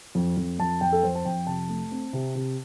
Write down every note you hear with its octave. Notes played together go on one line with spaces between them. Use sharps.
F2
F2
F2 A5
F2 G5
A4
F2 C5
A5
F2 G5
C3 A5
A3
C4
C3
C3